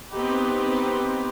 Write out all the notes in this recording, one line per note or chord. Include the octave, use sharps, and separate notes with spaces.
B3 C4 D#4 G4 B4